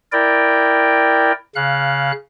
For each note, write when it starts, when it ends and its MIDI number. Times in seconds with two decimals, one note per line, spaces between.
0.12 1.32 64
0.12 1.32 70
0.12 1.32 74
0.12 1.32 79
1.55 2.12 49
1.55 2.12 77
1.55 2.12 90